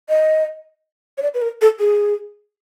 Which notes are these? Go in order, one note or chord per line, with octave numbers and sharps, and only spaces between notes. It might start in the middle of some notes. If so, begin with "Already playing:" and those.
D#5
C#5
D5
B4
A#4
A4
G#4